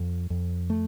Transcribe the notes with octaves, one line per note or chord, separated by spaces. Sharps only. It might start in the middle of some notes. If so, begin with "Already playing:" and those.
Already playing: F2
F2
A3